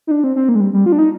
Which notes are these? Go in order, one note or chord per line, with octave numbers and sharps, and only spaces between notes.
D#4
D4
C4
C4
A#3
G#3
G3
G3
F4
D4
D#4